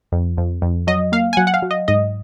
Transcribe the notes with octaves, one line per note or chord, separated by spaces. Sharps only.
F2
F2
F2
F#3 D#5
A#3 F5
G#5
F#3 F#5
F#5
F5
F#3
D#5
G#2 D#5